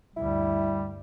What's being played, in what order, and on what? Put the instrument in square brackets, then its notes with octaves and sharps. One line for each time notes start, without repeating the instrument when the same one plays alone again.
[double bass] D2 G2 [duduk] G3 [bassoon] E4